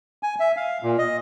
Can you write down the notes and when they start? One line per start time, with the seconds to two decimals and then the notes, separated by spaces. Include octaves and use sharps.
0.23 G#5
0.40 E5
0.57 F5
0.83 A#2
0.98 D#5